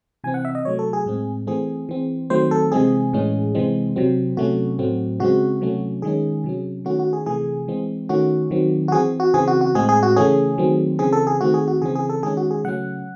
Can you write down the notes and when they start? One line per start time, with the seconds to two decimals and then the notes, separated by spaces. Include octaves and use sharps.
0.24 C3 E3 C4 G#5
0.34 F#5
0.45 E5
0.55 D#5
0.65 C3 F#3 A3 C#5
0.79 A4
0.93 G#4
1.06 A2 G#3 C4
1.47 E3 A3 C4 G#4
1.89 E3 C4
2.30 D#3 F#3 A3 C4 C5
2.51 A4
2.72 C3 E3 G#3 C4 G#4
3.13 A2 E3 G#3 C#4
3.55 C3 E3 G#3 C4
3.96 C3 F#3 C4
4.37 C3 F#3 A3 C#4 F#4
4.79 A2 F#3 A3 C4
5.20 C#3 G#3 C4 F#4
5.61 C3 F#3 A3 C#4
6.02 D#3 G#3 C#4 G#4
6.44 C3 F#3 C#4
6.85 D#3 A3 C#4 F#4
6.99 F#4
7.13 G#4
7.26 C3 E3 A3 G#4
7.68 E3 G#3 C4
8.09 D#3 A3 C#4 F#4
8.51 D#3 F#3 C4
8.88 F#4
8.92 E3 C4 G#4
9.20 F#4
9.34 C#3 E3 C4 G#4
9.48 F#4
9.61 F#4
9.75 A2 G#3 C4 G#4
9.89 G#4
10.03 F#4
10.16 C#3 E3 A3 C#4 G#4
10.58 D#3 F#3 A3 C4
10.99 C#3 E3 C4 G#4
11.13 A4
11.27 G#4
11.41 D#3 A3 C4 F#4
11.54 G#4
11.68 F#4
11.82 C#3 E3 C4 G#4
11.95 G#4
12.10 A4
12.23 D#3 G#3 C#4 G#4
12.37 F#4
12.51 G#4
12.64 C#3 F#3 A3 C#4 F#5